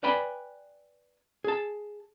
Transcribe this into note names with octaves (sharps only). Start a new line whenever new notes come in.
B4 D5 G5 G#5 B5
G#4 A5